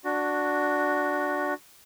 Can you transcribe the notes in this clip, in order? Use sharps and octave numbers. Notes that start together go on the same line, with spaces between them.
D4 F#4